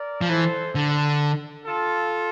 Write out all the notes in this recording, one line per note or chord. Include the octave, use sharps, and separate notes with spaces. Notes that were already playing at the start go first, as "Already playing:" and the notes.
Already playing: A#4 D5
F3
E3 A4 C5
D3
F4 A4